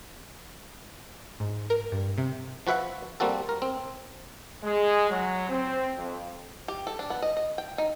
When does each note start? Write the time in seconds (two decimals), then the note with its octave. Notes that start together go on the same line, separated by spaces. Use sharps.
1.40 G#2
1.70 A#4
1.92 G2
2.18 C3
2.67 F3 F#4 B4 E5 F#5
3.20 G3 A#3 C4 F#4 A4
3.49 A#4
3.62 C4
4.63 G#3
5.10 F#3
5.49 C4
5.97 F2
6.68 G4
6.87 A4
6.99 D4
7.10 B3
7.22 D#5
7.37 D#5
7.58 G5
7.78 D#4